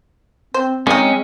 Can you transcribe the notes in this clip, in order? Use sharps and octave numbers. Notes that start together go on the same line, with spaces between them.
C4 C5
D#3 G#3 C4 C#4 D#4